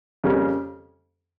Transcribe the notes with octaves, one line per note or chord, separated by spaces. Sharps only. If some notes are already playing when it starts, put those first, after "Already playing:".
F2 C#3 G3 A#3 C#4